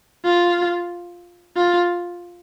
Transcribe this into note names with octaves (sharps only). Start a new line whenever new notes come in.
F4
F4